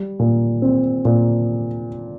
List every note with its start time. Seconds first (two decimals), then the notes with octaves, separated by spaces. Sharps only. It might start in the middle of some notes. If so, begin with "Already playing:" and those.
Already playing: G3
0.19 A#2
0.62 C4
1.05 A#2